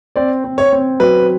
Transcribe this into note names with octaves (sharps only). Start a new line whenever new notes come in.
C4 D5
C4
C#5
C4
F#3 B4